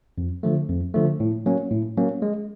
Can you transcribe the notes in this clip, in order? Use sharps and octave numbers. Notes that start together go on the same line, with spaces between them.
F2
D3 F3 A3
F2
D3 F3 A3
A2
F#3 A#3 C#4
A2
F#3 A#3 C#4
G#3